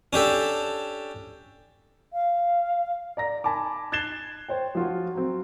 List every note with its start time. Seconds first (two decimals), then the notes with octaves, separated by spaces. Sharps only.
0.13 C#4 D4 G4 A4
2.13 F5
3.17 D5 A#5 A#6
3.44 G#5 A5 B5 D6
3.92 F#6 G#6 A6 C7 E7 G7
4.48 C5 C#5 G5
4.75 F3 F4 F#4
5.15 F#3 C4